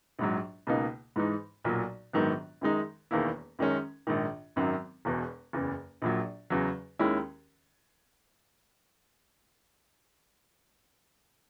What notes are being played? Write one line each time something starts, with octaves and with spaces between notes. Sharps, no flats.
A#1 G#2 F#3
C#2 B2 A#3 D#4
G#2 E3 G#3 D#4
B1 A#2 F#3
A#1 G#2 D#3 F#3 B3
F#2 D#3 G#3 D#4
E1 E2 D#3 A#3 E4
F#2 D#3 G#3 C#4
A#1 G#2 D#3
G#1 F#2 D#3 F#3
E1 E2 B2
F#1 E2 C#3
A#1 A#2 F#3
E2 C#3 F#3
D#2 D#3 G#3 C#4 E4